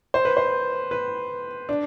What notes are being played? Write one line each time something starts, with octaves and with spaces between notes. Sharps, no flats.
C5
B4
C5
B4
D4